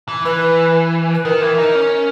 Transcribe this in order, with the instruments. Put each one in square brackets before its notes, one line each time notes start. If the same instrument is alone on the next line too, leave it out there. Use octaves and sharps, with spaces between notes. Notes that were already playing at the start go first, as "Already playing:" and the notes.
[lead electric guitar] E3
[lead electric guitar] E3 [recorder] B4
[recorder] B4
[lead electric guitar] D#3 [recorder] A#4
[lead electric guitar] E3
D#4
C#4